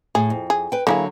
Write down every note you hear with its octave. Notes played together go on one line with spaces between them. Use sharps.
A2 G#4
F2
G#4
B4 G5
D3 F#3 A#3 E4 G#4